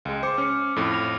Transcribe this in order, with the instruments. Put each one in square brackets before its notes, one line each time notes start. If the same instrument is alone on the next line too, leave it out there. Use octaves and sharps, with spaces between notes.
[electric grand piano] C#2 G#3
[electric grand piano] C5 [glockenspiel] D6 C#7
[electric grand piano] C#4 [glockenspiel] F6 C#7
[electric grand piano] F2 A2
[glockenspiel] A#6 F7